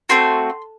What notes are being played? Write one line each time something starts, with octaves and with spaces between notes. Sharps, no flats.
A3 C4 F#4 C6